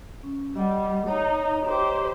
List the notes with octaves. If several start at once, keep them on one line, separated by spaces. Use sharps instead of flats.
C#4
G3 D#5 F#5
D#4 C#5 D#5 A#5
G4 C5